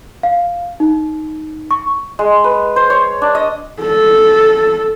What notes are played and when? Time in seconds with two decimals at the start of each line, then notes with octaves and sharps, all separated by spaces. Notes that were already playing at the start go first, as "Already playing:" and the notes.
0.23 F5
0.80 D#4
1.71 C#6
2.19 G#3
2.44 B4
2.76 C5
2.90 C#5
3.22 D4
3.35 D#5
3.81 A4